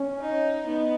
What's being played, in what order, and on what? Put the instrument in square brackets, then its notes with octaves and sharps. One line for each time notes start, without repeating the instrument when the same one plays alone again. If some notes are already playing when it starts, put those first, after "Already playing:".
Already playing: [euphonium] C#4
[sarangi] D#4
[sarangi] B3 [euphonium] D#4